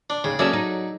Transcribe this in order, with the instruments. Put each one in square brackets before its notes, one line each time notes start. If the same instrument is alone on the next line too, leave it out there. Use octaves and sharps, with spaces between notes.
[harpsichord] D4
[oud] D#2 [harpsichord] C#3
[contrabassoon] F#3 [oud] A#3 C#4 A4 [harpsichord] G#4 D5 E5
[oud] D#4